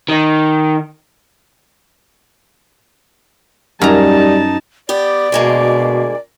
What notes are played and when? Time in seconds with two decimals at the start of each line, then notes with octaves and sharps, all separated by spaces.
0.09 D#3
3.81 F#2 G3 D#4 A5 A#5
4.89 B3 G4 D5
5.32 D2 B2 G#3 A#3